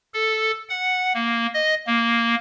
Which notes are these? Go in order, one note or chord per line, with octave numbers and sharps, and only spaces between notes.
A4
F#5
A#3
D#5
A#3